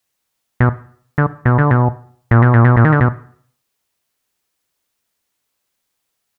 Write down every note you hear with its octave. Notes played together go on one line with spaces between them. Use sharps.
B2
D3
B2
D3
B2
A#2
B2
A#2
B2
A#2
D#3
D3
B2